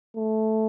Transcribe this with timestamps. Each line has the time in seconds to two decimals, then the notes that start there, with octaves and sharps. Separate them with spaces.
0.17 A3